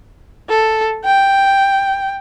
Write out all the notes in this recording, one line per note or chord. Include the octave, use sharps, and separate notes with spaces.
A4
G5